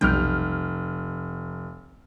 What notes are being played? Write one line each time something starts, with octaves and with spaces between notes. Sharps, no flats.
F1 B1 G3 G5 F6